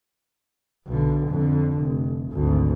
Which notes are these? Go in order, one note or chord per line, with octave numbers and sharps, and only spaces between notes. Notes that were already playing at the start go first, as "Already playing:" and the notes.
B1 D3
F2 D3
F1
G#1 D2